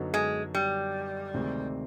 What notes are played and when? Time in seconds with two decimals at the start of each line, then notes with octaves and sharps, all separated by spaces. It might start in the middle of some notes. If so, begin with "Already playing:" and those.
Already playing: F#2 D3 F#3 B3 D#4
0.14 G#3
0.55 G3
1.34 D2 C3 D#3 G#3 C4